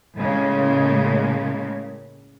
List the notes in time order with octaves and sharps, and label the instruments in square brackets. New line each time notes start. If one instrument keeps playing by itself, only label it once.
[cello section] A2 C#3 G#3 A#3